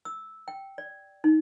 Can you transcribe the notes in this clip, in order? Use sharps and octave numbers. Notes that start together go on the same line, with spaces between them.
E6
G5
D5
D#4